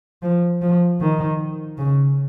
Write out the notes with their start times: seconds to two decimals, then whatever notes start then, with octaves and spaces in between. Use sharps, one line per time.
0.22 F3
0.62 F3
1.00 D#3
1.78 C#3